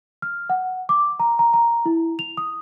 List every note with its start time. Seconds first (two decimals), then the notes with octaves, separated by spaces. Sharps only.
0.22 F6
0.50 F#5
0.89 D6
1.20 A#5
1.39 A#5
1.54 A#5
1.86 E4
2.19 F7
2.37 D#6